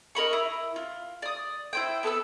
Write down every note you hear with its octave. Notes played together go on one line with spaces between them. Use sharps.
D#4 A#4 B5 C#6
E4
F4
D5 D#6
E4 C5 G5
B3 A4 B4 E6